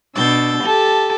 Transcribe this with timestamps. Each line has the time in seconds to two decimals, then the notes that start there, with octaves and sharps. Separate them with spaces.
0.15 B2 D4 E6 G6 A6
0.64 G4 A4 A5